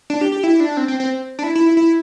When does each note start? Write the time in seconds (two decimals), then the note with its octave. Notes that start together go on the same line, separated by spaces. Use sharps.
0.10 D4
0.21 G4
0.32 G4
0.43 E4
0.60 D4
0.77 C4
0.88 C4
1.00 C4
1.39 D4
1.44 E4
1.55 E4
1.66 E4
1.77 E4